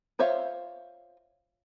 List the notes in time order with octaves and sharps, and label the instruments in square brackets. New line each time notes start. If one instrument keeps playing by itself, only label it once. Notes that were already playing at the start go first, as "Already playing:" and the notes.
[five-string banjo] F4 C5 C#5 E5 F5